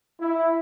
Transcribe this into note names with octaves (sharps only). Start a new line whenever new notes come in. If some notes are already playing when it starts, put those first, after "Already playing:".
E4